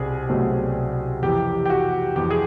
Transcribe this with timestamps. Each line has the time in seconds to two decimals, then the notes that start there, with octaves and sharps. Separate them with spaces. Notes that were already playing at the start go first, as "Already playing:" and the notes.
Already playing: C2 B2 C4 G#4
0.29 C2 B2 F#3 A3 C4
1.22 F2 C3 E3 G4
1.66 G4
1.70 F#4
2.16 F2 C3 E3 G4
2.31 G#4